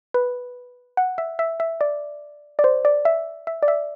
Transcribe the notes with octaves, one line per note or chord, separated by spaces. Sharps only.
B4
F#5
E5
E5
E5
D5
D5
C5
D5
E5
E5
D5
E5